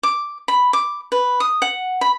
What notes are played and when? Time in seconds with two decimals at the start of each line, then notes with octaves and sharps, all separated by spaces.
0.03 D6
0.48 B5
0.73 D6
1.12 B4
1.40 D#6
1.62 F#5
2.01 B5